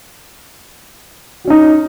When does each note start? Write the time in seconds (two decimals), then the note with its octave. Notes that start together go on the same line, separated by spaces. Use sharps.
1.45 F#4
1.47 C#4
1.50 D#4